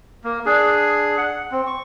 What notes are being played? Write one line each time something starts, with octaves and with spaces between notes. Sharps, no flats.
A#3
D4 G#4
F#5
C4
C#6